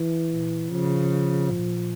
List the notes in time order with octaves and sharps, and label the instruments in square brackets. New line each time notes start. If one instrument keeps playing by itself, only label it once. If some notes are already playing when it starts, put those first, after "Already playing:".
Already playing: [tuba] E3
[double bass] A#2
[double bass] C#3 [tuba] F3
[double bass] A#2